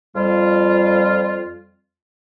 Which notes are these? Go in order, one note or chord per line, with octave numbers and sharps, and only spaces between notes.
F2 G3 F4